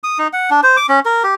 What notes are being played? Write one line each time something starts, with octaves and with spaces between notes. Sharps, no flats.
D#6
D#4
F#5
D4
C5
D6
C#4
A#4
G4